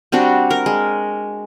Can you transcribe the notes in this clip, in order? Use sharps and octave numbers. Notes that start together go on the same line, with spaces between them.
G3 C4 D4 F#4
A#4
G#3